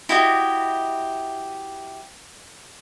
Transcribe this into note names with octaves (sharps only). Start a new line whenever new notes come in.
E4 F#4 G4 D#5